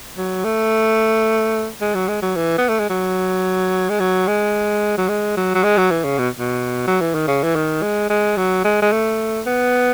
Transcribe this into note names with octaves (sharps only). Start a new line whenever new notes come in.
F#3
A3
G#3
F#3
G#3
F#3
E3
B3
A3
G#3
F#3
G#3
F#3
G#3
F#3
G#3
F#3
F#3
G#3
F#3
E3
C#3
B2
B2
F#3
E3
D#3
C#3
E3
D#3
G#3
G#3
F#3
G#3
G#3
A3
B3